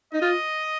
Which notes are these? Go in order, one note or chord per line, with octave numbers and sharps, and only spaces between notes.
D#4 D#5
F4